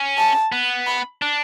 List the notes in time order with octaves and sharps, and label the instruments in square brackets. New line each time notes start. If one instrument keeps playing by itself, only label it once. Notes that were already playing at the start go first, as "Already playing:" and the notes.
Already playing: [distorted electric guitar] C#4
[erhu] A5
[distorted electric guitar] B3
[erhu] B5
[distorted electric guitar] D4